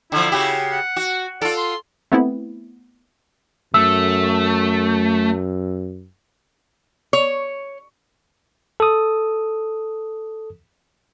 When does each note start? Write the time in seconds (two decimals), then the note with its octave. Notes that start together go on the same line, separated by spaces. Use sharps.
0.12 D3 F3 E4
0.32 C#3 F#4 G4
0.72 F#5
0.96 F#4
1.42 F4 A4 D5
1.57 C6
2.12 A3 B3 C4 E4
3.74 F#2 A3 E6
7.13 C#5
8.80 A4 D#6